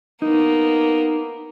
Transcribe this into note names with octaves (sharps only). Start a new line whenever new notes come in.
A#3 B3 D#4